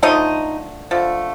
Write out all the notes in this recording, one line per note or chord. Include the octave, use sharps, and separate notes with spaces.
D3 F3 A3 D#4 D#5
D3 F3 A3